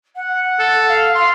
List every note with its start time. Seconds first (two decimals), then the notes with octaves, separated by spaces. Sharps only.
0.15 F#5
0.59 A4
0.88 F5
1.15 F5 C6